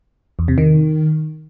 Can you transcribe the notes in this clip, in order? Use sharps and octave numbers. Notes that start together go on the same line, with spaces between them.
E2
C3
D#3